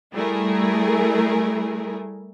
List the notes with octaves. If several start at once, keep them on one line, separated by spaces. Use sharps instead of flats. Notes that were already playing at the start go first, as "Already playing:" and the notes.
G3 A3 E4 G#4 A#4